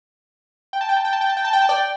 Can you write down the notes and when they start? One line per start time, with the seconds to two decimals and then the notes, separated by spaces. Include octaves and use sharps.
0.73 G5
0.81 A5
0.89 G5
0.97 A5
1.05 G5
1.13 A5
1.21 G5
1.29 A5
1.37 G5
1.45 A5
1.53 G5
1.62 A5
1.69 D5 G5